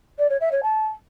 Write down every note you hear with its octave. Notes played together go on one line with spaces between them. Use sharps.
D5
C#5
E5
C#5
A5